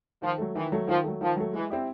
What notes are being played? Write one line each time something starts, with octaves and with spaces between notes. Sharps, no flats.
D#3 F3
F#3 A3
D#3 E3
F#3 A3
D#3 F3
F#3 A3
D#3 F3
F#3 A3
E3 G#3
C4 E4 G4